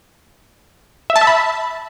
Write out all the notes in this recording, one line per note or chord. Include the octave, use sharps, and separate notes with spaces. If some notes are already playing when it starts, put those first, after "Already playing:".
E5
A5
E5
B5